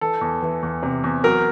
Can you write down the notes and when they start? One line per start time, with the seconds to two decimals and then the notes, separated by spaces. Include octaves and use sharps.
0.01 E3 A4
0.21 E2
0.42 E3
0.63 E2
0.83 C3
1.04 E2
1.24 F#3 A#4